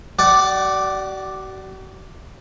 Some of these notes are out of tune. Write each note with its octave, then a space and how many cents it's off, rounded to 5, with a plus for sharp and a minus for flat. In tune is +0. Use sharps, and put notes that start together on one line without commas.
F#4 +45 D5 +0 F#5 +0